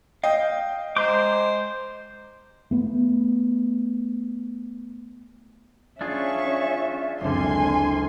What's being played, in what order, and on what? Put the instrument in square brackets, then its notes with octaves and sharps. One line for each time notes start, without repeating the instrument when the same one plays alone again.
[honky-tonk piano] D#5 G5 [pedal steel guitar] F5
[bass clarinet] G#3 [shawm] C5 [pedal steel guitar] A#5 C6 D6 [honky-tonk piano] G6
[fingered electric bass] A3 B3
[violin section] C#4 C#6 [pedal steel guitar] D4 F4 G#4 [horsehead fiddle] E5
[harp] F#1 D2 [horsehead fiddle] G#3 C4 [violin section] G#5 C6